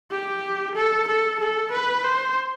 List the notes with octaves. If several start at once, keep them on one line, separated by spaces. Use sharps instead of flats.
G4
A4
A4
A4
B4
C5